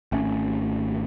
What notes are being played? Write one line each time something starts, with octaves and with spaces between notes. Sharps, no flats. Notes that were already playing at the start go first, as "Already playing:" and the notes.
G#1 A3 C#4